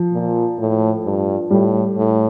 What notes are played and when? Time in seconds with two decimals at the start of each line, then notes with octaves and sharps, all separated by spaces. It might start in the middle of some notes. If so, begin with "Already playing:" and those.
Already playing: F3
0.12 A#2
0.59 A2
1.04 G2
1.51 A2 G3
1.96 A2